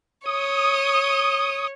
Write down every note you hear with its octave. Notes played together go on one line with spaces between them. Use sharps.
C#5 D#6